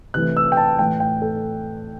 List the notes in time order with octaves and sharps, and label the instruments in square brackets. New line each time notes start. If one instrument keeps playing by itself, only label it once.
[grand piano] C3 E3 A3 F#6
E6
G5
A5
A2 E3 A3 G5
G5
A4